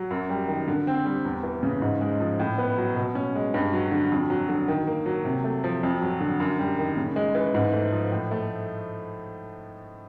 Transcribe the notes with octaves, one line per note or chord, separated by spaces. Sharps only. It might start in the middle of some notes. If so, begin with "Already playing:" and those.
Already playing: F#3
F#2
G3
D#3
D3
C4
G3
E2
E3
C#3
G#2
G#3
F3
A2
B3
F#3
B2
C#4
G#3
G2
F#3
D3
F2
F#3
D3
D#3
A#3
F#3
C3
A3
F3
F2
F#3
D3
F#2
G3
D#3
C#3
G#3
E3
G#2
A3
F3
A2
A3